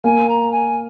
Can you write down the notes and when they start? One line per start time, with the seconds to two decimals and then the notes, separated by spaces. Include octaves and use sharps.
0.04 A#3 G#5
0.28 A#5
0.51 G#5